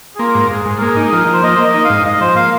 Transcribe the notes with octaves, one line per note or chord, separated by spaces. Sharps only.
G#4
A#3 F4
G#2
G#2 G#4
G#2
A#4
A#3 G#4
D#4
G#4
F3 A#4
F3
C5
A#3 D#5
A#3 C5
D#5
D#4
G#2 F5
G#2 D#5
F3 C5
A#3 F5